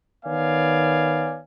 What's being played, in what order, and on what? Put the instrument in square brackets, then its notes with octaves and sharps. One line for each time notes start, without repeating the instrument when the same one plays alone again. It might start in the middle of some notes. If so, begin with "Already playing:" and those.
[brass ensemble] D#3 B3 C#5 D5 F5 G#5